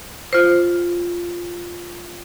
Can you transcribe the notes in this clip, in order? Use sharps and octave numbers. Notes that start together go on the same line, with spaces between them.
F4 C5